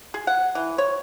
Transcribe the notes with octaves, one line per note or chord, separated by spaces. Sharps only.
G#4
F#5
E3
C#5